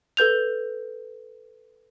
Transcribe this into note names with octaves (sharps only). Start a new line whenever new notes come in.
A4 B4 G6 F7